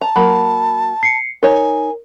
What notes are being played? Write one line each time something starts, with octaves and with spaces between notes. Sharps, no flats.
A5 A#5
F#3 A#3 B5
C7 C#7
D#4 A#4 C#5 G#5